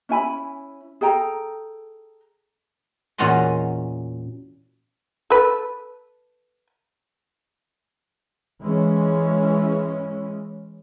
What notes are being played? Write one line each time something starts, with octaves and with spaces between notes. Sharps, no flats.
C#4 E4 G#5 B5
G#4 A4 G5 A#5
E2 A#2 C#4 F#4 D#5 C6
A4 B4
E3 G#3 C#4